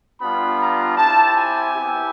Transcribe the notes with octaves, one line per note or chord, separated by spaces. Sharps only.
G3 B3 D4 F4 B5
A#5
C4 E4 G4 A5
G#5
B3 E4 G4